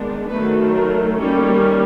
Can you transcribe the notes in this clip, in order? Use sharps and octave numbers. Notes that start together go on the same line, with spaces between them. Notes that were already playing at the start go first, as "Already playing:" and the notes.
Already playing: D#3 G#3 B3 D4
D#3 F#3 A3 B4
A#4
D#3 G3 A#3 C#4 A4